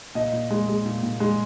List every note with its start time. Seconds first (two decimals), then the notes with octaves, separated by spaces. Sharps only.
0.15 A#2 D#5
0.33 A#2
0.50 G#3
0.68 G#3
0.85 A#2
1.03 A#2
1.20 G#3